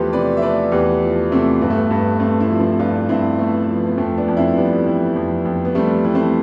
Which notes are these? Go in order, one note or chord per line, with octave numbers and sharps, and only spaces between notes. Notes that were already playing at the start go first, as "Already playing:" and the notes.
Already playing: E2 F3 A3 G4 A4 B4 C5
C3 B4 D5
E5
A3 B4 D5
E2 G4 B4
F3
C3 A3 C4
G2 B3
A3
B3
G2
A3 C4
C4 E4
F3
C4 E4
G2 D4 F4
G2 C4 E4
A3 B3
F3
B3
F2 A3 C4
B3 D4
F2
C4 E4
G3 B3 D4
E3
F2
F2
B3
G3 A3 C4
E3
A3 C4